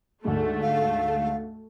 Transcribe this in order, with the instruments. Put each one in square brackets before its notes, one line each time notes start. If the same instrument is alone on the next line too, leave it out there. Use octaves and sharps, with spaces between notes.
[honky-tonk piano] D2 G#2 [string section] A3
[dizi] F5